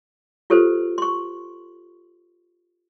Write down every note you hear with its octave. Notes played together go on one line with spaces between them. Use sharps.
F4 G4 A4 B4 C5
C6 C#6